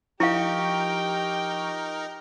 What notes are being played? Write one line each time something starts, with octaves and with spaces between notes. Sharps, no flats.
F3 D#4 E4 G4 A#4 F5 G5 C#6